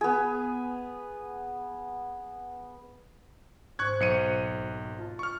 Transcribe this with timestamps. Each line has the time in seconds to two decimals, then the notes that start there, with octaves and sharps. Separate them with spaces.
0.01 B3 G#4
3.79 G#1 C5 C#6 F#6 G#6
4.00 B1 C#7 D#7
4.98 F4 D#5 A5
5.19 C#6 F6